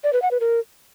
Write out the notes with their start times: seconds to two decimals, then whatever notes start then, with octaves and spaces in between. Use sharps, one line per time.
0.04 D5
0.13 B4
0.22 F#5
0.31 B4
0.40 A#4